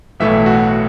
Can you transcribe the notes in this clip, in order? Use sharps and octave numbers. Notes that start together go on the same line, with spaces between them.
B1 A2 E3 A3 E5
F#4